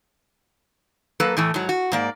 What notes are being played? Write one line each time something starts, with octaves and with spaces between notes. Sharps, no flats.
F#3 A#3 A4 B4
A2 E3 A3
G#2 F#3
F#4
G#2 A#3 D5